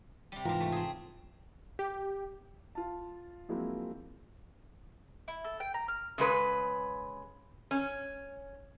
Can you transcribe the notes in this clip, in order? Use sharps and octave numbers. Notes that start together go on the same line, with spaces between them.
C3 G3
G#2 C3 E3 F4 A#4
A3
C4 G#4
G4
F4 A5
F3 F#3 G#3 A#3 C4 E4
E4
A4
G5
A#5
F6
C#3 G#3 B4
C#4